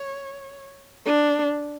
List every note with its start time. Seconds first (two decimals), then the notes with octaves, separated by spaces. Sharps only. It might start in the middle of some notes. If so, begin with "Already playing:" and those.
Already playing: C#5
1.06 D4